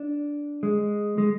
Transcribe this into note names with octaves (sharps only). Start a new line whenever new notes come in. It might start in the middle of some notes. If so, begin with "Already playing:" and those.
Already playing: D4
G#3
G#3